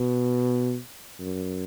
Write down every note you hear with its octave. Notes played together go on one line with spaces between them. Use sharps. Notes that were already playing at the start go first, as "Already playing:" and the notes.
Already playing: B2
F#2